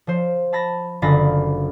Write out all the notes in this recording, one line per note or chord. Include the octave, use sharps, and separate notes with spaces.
F3 C5
A5 B5 A6 A#6
F#1 D3 F4 B5 A6 A#6